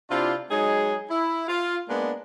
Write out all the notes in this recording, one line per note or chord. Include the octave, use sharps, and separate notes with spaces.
C3 D4 E4 F4
F#3 G#3 D#4 G#4
E4
F4
G#3 A#3 B3 D4